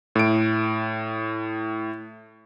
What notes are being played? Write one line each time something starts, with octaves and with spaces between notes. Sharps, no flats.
A2 D7